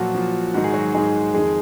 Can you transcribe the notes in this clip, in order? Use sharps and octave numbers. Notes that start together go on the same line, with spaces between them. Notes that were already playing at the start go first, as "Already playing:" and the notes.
Already playing: A#2 F3 F#3 F#4
A#2 F3
G#2 D#3 F#4
G#4
F#3 F#4
G#2 D#3 G#3 G#4
F2 D#3 G#3 G#4